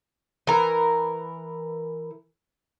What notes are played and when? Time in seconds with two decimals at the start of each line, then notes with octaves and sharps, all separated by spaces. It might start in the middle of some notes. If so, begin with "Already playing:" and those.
0.47 E3 A#4